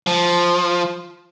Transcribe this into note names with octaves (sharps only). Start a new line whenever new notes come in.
F3